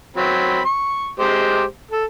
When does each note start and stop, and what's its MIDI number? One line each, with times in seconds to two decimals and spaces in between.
0.17 0.61 54
0.17 0.61 60
0.17 0.61 83
0.65 1.10 85
1.19 1.64 56
1.19 1.64 67
1.19 1.64 72
1.91 2.05 69